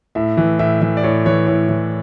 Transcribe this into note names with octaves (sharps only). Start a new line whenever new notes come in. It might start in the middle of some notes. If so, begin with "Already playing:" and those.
A2 E5
E3
A2 E5
E3 E5
D5
A2 C#5
E3 C#5
A2 C#5
E3